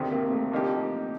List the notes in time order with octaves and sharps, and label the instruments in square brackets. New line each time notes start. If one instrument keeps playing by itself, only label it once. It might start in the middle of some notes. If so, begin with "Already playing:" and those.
Already playing: [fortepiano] D2 C3 D#3 [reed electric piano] C4 A4 A#4
[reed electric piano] A#3
A3
[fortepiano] D3 F3 A#3 D#4 G4